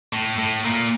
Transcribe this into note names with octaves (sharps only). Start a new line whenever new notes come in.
A2
A2
A#2